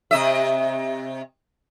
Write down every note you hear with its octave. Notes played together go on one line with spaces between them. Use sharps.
C3 D#5 E5